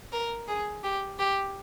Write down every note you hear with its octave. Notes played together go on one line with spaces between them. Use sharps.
A#4
G#4
G4
G4